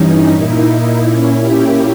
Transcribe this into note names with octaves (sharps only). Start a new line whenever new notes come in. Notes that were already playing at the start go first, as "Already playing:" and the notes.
Already playing: G2 E3 G3 C#4 D#4
A#2 A#3 D#4 E4
A#2 A#3 C#4
G4